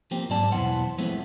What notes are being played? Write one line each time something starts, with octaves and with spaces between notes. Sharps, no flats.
F3 A#3 C4 G4
G#2 F#3 D5 A5
B1 E2 E3 B3 C5 F#5
F3 G#3 A3 B3 C4 E4